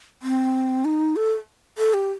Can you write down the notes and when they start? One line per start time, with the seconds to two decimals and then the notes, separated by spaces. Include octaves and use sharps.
0.22 C4
0.85 D#4
1.16 A4
1.78 A4
1.94 G4